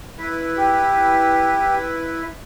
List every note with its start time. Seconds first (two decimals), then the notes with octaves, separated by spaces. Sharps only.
0.18 E4 B4
0.58 G4